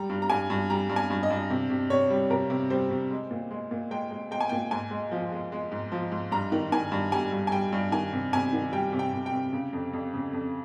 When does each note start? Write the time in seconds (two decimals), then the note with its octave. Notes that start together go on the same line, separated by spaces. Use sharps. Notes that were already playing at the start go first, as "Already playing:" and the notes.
Already playing: G3 A#5
0.10 G2
0.22 A#5
0.30 G2 G#5
0.50 G2
0.70 G3 A#5
0.89 G2
0.96 G#5
1.10 G2
1.23 D#5
1.30 G2
1.50 C3
1.70 C3
1.90 C3 C#5
2.10 G3
2.30 C3 A#4
2.50 C3
2.70 G3 C5
2.90 C3
3.11 G#3
3.31 A#2
3.51 G#3
3.71 A#2
3.91 G#3 G5
4.11 G#3
4.31 G#3 G5
4.41 G#5
4.49 A#2 G5
4.71 G#2 G#5
4.91 G#3
5.12 F3
5.32 G#3
5.52 G#3
5.72 G#2
5.92 F3
6.12 G#2
6.31 G2 A#5
6.52 D#3
6.72 D#3 G#5
6.92 G2
7.12 G3 G#5
7.32 G2
7.47 G#5
7.52 G3 G5
7.73 G2
7.92 D#3 G#5
8.13 C3
8.33 C3 G#5
8.53 D#3
8.72 G3 G5
8.93 C3
8.99 G5
9.13 C3
9.26 G5
9.33 C3
9.53 C#3
9.73 F2
9.93 F2
10.14 C#3
10.33 F2